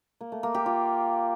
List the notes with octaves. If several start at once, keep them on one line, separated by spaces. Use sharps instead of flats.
A#3
A3
A#3
G4
F4